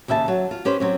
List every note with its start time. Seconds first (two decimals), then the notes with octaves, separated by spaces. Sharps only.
0.08 D#2 C#3 E5 G5 A5
0.28 F#3
0.51 F4
0.65 C#4 G4 B4 C5
0.80 F#3 C4 C#4